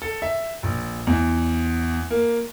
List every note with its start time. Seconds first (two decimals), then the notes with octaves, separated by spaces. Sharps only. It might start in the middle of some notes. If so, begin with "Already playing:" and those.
0.02 A4
0.22 E5
0.63 A#1
1.07 E2
2.11 A#3